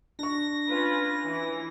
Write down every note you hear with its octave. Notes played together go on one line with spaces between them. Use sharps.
D4 C#6 A#6
C#4 F4 B4
E3